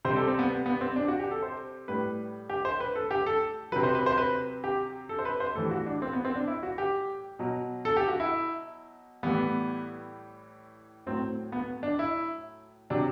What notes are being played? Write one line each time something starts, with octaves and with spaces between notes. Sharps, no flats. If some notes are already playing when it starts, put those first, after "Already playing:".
C3 G3 C5
A4
C4
B3
B3
C4
D4
F#4
G4
A4
C5
A2 G3 B4
G4
C5
B4
A4
G4
A4
C3 F#3 B4
C5
B4
C5
B4
G4
A4
C5
B4
C5
A2 E3 G3 A4
F#4
D4
C4
B3
C4
D4
E4
F#4
G4
B2 F#3
A4
G4
F#4
E4
A2 E3 G3 B3
A2 F#3 C4
B3
D4
E4
C3 F#3 D4